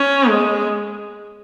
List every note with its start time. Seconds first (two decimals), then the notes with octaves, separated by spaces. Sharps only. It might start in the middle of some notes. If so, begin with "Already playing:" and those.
Already playing: C#4
0.29 G#3